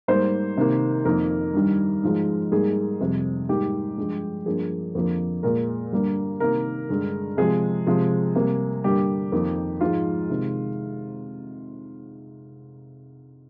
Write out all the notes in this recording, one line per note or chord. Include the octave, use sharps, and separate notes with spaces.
G#2 G3 A#3 C5
C3 D#3 A#3
F2 D#3 A#3 A#4
G2 D#3 G3
G#2 F3 G#3
G#2 G3 A#3 G#4
F2 C3 G3
G#2 G3 A#3 G4
G2 F3 G#3
G2 F3 A#3 G#4
F2 D3 F3 A#3
A#2 G#3 A#4
G2 D3 G3 A#3
C3 D#3 A#3 A#4
G2 D3 G#3
C3 F3 G#3 G#4
C3 F3 G#3
C3 G3 A#3
G2 D3 G3 A#3 G4
F2 D#3 A#3
G#2 F3 G#3 F4
C3 D#3 G#3